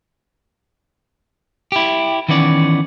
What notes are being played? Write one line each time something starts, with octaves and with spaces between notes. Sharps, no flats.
E4 G4
D#3 E3 B3 C#4 D5